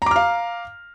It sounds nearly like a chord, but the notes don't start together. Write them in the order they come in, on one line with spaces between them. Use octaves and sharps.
A#5 D6 F6 F5